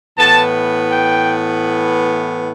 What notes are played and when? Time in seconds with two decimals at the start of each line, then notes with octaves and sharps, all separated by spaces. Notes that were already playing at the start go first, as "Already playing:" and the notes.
0.18 A2 E3 B3 A5
0.92 G5